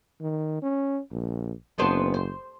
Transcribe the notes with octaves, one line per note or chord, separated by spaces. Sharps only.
D#3
C#4
A#1
F#1 B3 D4 C5
C5